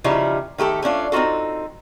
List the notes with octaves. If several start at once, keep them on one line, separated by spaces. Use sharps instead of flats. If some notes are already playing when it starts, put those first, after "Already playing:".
C#3 F3 G3 D#4 E4 G4
D#3 A3 G4 A4
A3 C#4 D4 F4
C4 D#4 F4 F#4 A4